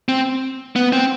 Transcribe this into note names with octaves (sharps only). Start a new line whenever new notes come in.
C4
B3
C4